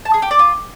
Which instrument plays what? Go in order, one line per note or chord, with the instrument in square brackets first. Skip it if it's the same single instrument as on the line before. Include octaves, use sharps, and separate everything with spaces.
[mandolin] A5
G#4
G4
D5
F4